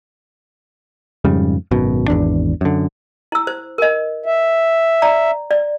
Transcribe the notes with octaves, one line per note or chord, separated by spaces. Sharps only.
F2 G#2 C#3 G3
G#1 F#2 B2
G#1 E2 D4
F#2 D3
E4 E6
C5
A#4 D#5
E5
D5 A#5
D5